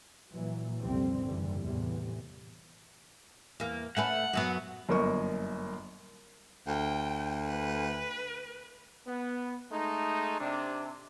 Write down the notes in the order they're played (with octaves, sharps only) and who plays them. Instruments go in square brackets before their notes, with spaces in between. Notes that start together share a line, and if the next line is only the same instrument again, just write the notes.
[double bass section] A#2 E3 F#3
C2 F2 A#2 D3 G3 C4
F#1 G#2 D3 E3 G3
E2 A2 C3 E3
[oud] E2 A#3
[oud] A3 C#4 B4 [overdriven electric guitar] F#5
[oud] F#2 F#3 B3
[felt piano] G1 F#2 A#3 A#4 D#5 C#6
[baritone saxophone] D2 [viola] G5
[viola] B4
[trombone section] B3
G#3 A3 D#4
C3 D4